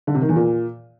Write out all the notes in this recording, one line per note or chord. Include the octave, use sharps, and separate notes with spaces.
D3
C3
D#3
E2
A#2